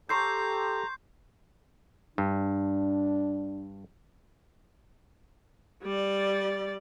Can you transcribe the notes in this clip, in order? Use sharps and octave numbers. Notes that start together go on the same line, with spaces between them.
G4 A4 C5 A#5 C#6 E6 G6 C7
G2 D4
G3 D5